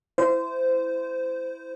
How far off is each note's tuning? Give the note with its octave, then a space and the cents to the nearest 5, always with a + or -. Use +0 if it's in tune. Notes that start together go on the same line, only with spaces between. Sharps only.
E4 +10 C5 -20